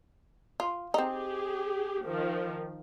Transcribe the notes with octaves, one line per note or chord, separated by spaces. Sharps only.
F4
C4 D#4 G4 G#4
D#3 F3